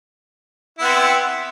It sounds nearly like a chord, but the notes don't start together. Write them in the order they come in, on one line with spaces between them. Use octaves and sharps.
E4 B3 C4